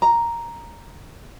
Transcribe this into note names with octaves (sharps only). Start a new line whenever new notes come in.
A#5